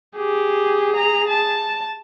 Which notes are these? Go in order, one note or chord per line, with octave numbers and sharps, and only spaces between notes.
G4 G#4
A#5
A5